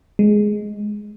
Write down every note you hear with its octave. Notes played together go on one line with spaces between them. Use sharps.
G#3